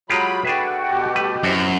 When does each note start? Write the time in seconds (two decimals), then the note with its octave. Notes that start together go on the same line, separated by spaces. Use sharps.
0.10 F#3 G#3 F4 G4 B5
0.45 D4 F#4 G#4 A4 B4 E5 G5
0.88 B2 G4
1.15 G3 A3 B4
1.43 F#2 B3 C4 E4 F#4 C5 C6